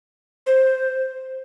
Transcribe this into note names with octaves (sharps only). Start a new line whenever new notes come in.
C5